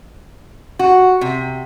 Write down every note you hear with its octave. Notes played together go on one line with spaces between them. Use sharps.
F#4
C3